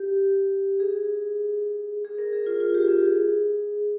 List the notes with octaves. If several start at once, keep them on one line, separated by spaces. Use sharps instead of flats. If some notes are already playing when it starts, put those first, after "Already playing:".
Already playing: G4
G#4
G#4
A#4
G#4
F4
F4
G4
G#4